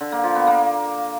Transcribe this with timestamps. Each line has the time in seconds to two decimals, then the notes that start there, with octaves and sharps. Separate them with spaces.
0.01 D3
0.12 A#3
0.24 F3
0.35 B3
0.47 A#3